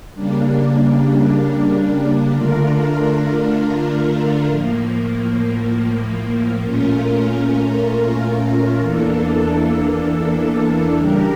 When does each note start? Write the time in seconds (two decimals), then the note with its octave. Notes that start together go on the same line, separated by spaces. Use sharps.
0.15 C#3 G3 A#3 D4
2.31 D3 A3 D4 F4 A#4
4.48 A2 F3 A#3
6.64 A#2 A3 C#4 F4 A#4
8.80 E2 E3 A#3 D4 A4
10.97 C#3 G3 D4 G4 A#4